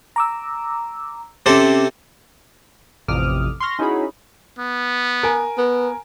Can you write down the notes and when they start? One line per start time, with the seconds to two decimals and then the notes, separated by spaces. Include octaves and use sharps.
0.16 A#5 D6 E6
1.46 C3 C4 C#4 A4 D6
3.08 A1 F2 C3 D6 D#6 F6
3.60 C6 C#6 F6 A#6
3.79 C#4 D#4 E4 F#4 G#4 B5
4.59 B3
5.23 A#4 G#5
5.58 B3